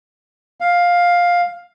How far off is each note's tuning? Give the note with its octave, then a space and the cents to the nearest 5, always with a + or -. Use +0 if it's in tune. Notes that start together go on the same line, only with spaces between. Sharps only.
F5 +10